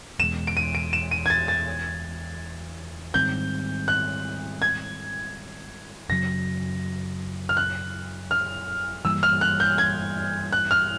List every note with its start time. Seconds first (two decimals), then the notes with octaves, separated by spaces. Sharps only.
0.19 E2 B2 G#3 E7
0.47 D7
0.57 D#7
0.75 D7
0.93 E7
1.11 D#7
1.26 G#6
1.30 A6
1.48 A6
3.14 G#2 D#3 G3 C4 G6
3.88 F#6
4.62 G#6
6.09 F#2 C#3 F#3 A#6
7.49 F6
7.57 F#6
8.31 F6
9.04 G2 E3 G3 A#3 E6
9.23 F6
9.41 F#6
9.60 G6
9.78 G#6
10.52 F#6
10.71 F6